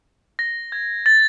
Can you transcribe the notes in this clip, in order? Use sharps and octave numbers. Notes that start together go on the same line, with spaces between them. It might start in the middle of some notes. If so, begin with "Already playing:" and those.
A#6
G#6
A6